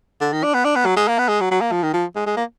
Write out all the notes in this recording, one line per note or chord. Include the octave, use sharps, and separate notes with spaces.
D3
D#3
D4
B3
D4
B3
F#3
G#3
A#3
B3
G#3
F#3
F#3
A#3
F3
D#3
F3
G#3
G#3
A#3